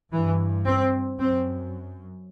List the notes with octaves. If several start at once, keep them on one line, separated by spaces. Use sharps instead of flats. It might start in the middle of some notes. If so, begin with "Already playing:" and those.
G2 E3
C4
F#2 C4